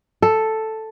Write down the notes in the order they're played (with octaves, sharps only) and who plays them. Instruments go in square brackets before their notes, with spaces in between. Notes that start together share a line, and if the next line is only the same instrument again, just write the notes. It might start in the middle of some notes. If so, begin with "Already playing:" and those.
[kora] A4